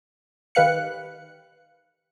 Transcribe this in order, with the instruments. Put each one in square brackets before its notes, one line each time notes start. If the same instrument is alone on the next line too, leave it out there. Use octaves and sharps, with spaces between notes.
[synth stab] D#3 G4 B4 F5 F#6 C#7